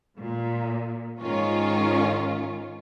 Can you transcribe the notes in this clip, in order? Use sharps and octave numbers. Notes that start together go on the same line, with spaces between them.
A#2
G#2 D#3 C#4 F4